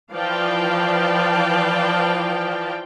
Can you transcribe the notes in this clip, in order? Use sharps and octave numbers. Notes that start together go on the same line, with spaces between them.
E3 F3 D5 F5 G5 A5